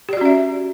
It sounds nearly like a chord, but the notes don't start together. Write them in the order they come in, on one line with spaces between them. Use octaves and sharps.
G4 D5 F#4 C#4 E5